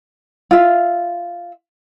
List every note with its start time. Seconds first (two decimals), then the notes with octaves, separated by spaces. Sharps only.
0.51 F4 E5